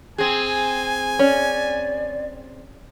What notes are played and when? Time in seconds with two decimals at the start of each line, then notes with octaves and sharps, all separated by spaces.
0.18 C4 G#4 G#5
1.19 C#4 D5